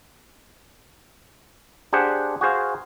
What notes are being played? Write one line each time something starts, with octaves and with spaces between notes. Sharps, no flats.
D4 G4 G#4 C5 F#5
F#4 G#4 C5 F5